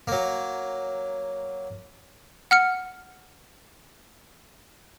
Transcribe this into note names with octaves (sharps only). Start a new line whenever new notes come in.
F#3 A#3
F#5 F6 C#7